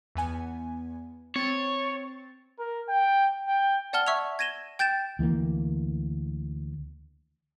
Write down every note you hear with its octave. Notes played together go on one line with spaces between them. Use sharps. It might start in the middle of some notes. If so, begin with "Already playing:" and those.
E2 B3 G#5
C4 C#5 A6
A#4
G5
G5
D5 F#5 A5 F6 G7
E5 C#6 E6 G#6 F7
G#6 A#6 D#7 E7 G7
G5 G6 A6 D7 E7
D2 E3 G3 A#3